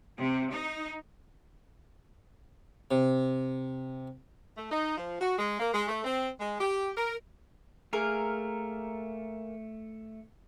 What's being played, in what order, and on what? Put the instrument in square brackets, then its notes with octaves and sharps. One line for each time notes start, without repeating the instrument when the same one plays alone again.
[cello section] C3
D#4
[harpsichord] C3
[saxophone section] A3
D#4
F3
F#4
G#3
A#3
G#3
A3
C4
G#3
G4
A#4
[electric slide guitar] A3 [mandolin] A#3 G#4 A#4